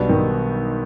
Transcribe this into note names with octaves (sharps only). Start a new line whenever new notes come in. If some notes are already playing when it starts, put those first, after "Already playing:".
Already playing: B1 B2 G3 B3 D4
D#3